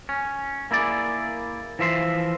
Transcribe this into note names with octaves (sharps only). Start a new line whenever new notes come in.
C#4
A#3 E4 G#4 D5
E3 F3 E5 C6